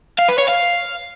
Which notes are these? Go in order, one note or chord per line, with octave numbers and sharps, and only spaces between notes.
F5
B4
C#5
F5